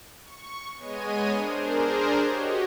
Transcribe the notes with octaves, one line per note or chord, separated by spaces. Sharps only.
C#6
G#3 B3 C#5 D#5 G#5 D#7
D4 G#4 A#4 C5
F#4 G4 C#5 D#5